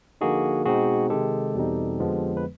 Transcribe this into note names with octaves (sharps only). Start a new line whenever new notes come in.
D3 F3 A#3 D#4 F#4 G#4
B2 G#3 C4 D#4 F#4 G#4
C3 D#3 G#3 G4 A4
E2 B2 G3 C4 D#4
F2 D3 F3 G#3 B3
B4